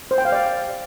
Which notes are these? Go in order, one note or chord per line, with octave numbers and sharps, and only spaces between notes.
C5
G5
F5
D5